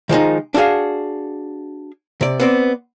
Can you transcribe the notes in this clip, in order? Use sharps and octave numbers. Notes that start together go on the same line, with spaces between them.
D#3 F3 G#3 D#4
D4 E4 F#4 G#4 F5
C3 D5
B3 C4 D5